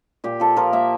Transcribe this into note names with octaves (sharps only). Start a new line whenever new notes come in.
A#2 G4
F3 A4
F3 A#4
A#3 E5